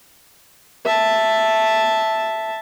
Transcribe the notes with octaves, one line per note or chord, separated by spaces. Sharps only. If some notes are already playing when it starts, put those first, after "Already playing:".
E5 A5